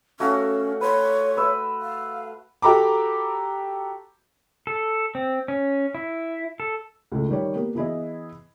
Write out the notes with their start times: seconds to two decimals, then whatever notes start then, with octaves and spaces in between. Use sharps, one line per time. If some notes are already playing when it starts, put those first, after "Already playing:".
0.20 A3 C#4 F#4 F5
0.81 B4 C#5 C6
1.37 B4 E5
1.81 F5
2.62 F#4 G4 A4 A#5 B5 D6
4.67 A4
5.15 C4
5.48 C#4
5.95 E4
6.60 A4
7.12 C#2 A2
7.29 D#3 G3 C#5
7.55 A#3 B3 G4
7.75 E3 B3 E4 G#4 D#5